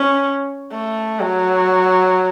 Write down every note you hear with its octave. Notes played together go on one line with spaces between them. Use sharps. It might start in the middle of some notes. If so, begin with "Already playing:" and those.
Already playing: C#4
A3
F#3